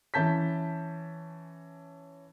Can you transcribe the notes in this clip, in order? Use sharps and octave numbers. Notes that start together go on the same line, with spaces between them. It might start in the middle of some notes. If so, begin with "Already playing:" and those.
E3 C#4 A5 G6 B6